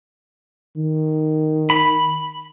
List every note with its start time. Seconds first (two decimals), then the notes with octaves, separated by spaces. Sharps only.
0.77 D#3
1.70 B5